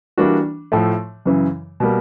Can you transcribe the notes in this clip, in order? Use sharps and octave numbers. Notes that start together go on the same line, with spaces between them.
E3 G3 A#3 D4 F#4
A2 F3 A3
F#2 C#3 E3
B2 G3 A#3